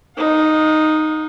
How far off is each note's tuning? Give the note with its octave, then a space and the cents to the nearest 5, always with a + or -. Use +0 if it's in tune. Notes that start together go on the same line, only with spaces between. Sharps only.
D#4 +0 F5 +45